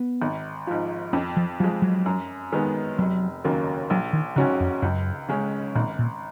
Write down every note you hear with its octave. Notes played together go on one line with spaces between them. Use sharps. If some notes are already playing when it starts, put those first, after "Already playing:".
Already playing: B3
G#1
G#2 F3
F2 C#4
F3
F3 F#3 G#3
F#3
F#2
D#3 G#3 B3
F1 F#3
D#2 C#3 F#3 A#3
A#1 F#3
D#3
G#2 C#3 F#3 C#4 F#4
F2
C#2 F#2
C#3 G#3 C#4
G#1 A#2
A#2